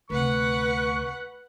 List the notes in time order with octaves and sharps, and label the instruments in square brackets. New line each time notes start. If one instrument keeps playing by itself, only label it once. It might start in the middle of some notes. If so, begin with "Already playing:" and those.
[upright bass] D2 C3 [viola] B4 F#5 [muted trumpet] C#6